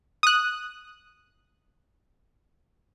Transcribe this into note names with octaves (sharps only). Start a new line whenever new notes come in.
D#6 F#6